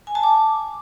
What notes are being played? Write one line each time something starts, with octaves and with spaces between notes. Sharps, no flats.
G#5
A5
D6